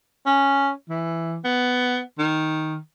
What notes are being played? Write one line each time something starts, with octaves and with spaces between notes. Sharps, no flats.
C#4
E3
B3
D#3